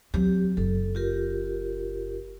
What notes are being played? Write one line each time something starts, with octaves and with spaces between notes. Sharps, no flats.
F#3 C4 G4
F#1 A4
F4 G4 A#4